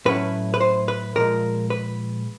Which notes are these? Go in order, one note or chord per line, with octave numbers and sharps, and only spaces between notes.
A2 F#3 A3 C#4 E4 B4
B4
C5
B4
A#2 F3 G#3 A#4
B4